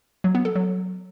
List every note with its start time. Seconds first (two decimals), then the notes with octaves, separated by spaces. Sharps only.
0.24 F#3
0.35 B3
0.45 A4
0.55 F#3